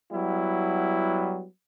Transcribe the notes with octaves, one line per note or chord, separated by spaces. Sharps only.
F#3 G3 B3 E4